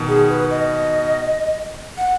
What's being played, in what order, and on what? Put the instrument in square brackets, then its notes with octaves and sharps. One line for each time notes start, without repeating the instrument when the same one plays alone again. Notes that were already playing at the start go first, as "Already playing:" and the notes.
Already playing: [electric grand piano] B2 D#3
[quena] G#4
B4
D#5
F#5